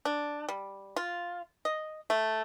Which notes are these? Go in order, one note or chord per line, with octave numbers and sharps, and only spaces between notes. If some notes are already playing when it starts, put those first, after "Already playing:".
D4
G3
F4
D#5
A3